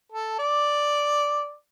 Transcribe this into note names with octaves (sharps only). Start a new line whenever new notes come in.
A4
D5